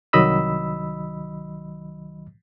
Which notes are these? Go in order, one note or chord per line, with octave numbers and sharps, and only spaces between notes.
C2 D#3 F#3 D#5 B5 E6